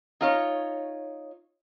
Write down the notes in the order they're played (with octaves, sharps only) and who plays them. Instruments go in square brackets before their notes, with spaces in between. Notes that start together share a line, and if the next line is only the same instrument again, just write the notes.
[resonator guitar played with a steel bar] D#4 F4 C#5